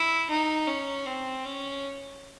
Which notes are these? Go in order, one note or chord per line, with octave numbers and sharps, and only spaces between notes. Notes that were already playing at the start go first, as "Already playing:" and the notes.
Already playing: E4
D#4
C#4
C4
C#4